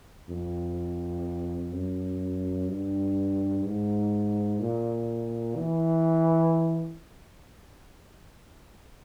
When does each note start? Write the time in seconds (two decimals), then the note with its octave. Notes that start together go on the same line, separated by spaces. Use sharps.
0.29 F2
1.72 F#2
2.69 G2
3.64 G#2
4.60 A#2
5.56 E3